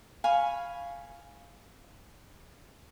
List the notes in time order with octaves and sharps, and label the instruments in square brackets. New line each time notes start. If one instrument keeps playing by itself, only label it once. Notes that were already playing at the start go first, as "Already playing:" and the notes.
[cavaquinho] F5 G#5 B5 C#6